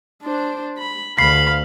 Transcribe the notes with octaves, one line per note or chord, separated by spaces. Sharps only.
D4 C5
B5
D2 F5 B5 C7